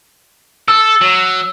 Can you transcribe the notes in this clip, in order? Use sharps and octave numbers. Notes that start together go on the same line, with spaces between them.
A4 E6
F#3